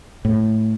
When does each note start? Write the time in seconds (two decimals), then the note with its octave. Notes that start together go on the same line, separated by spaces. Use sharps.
0.25 A2